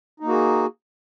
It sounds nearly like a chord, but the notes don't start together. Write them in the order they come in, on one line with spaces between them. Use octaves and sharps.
D#4 A#3 F#4 G#4